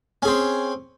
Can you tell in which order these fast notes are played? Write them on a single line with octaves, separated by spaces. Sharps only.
C#4 G#4 C4